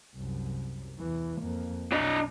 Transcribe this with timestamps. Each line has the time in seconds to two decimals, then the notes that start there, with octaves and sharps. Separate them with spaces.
0.15 C2 F#2
0.99 E2 E3
1.40 F2 A#3
1.92 B1 D4 D#5